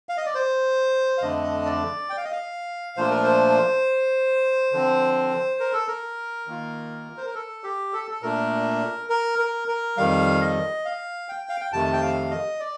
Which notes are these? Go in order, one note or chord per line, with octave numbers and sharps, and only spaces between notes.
F5
D#5
D5
C5
F5
F2 D3 A3 D4 D#5
D5
G5
F5
D#5
F5
A#2 F3 A3 D4 F4 C5
A#4
C5
D3 F3 C4
A#4
A4
A#4
D#3 A#3 F4
C5
A#4
A4
G4
A4
A4
A#2 A3 D4 A#4
A#4
A#4
A#4
F2 D#3 G3 F5
D#5
F5
G5
F5
G5
F2 C3 D#3 A3 A5
G5
F5
D#5
D5